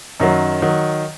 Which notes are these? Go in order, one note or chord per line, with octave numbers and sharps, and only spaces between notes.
F#2 D#3 F#3
D#3 F#3